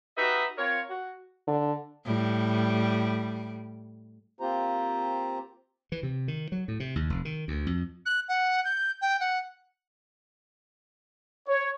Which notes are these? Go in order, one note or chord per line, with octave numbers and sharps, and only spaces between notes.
D#4 F#4 G4 B4 D#5 E5
C4 F4 A#4 C#5
F#4
D3
A2 G3
A#3 C4 F4 G4 C5 A#5
E3
C3
D#3
F#3
A2
C3
D#2
F1
D#3
D2
F2
F#6
F#5
G6
G5
F#5
C#5